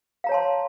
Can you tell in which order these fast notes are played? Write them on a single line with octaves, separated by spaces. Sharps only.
F5 A#5 C#5 A5 C6